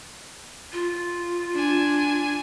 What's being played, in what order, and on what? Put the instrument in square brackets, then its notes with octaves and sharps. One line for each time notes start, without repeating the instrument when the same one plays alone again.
[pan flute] F4
[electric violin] D4 G#5